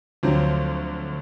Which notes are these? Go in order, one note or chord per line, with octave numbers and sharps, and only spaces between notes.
D2 F3 F#3 C4